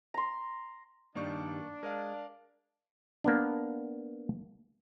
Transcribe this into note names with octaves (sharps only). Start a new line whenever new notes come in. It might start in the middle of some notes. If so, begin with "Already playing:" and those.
A#5 C6
G2 D#3 G3 A#3 D4 D5 C#6
G#3 A#4 D5 F5
A#3 B3 D4